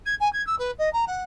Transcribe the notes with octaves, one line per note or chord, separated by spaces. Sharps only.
G#6
G#5
G#6
E6
B4
D#5
A#5
F#5